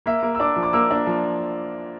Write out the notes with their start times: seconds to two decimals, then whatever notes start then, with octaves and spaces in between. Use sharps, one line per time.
0.06 A#3 E5
0.23 A#3
0.35 E6
0.40 D4 D6
0.56 F3
0.63 D6
0.73 A#3 E6
0.91 D4
1.07 F3